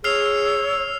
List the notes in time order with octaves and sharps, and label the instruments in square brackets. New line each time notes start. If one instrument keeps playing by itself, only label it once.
[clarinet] G#4 [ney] C#5 [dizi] E6 [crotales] F6 C7 F7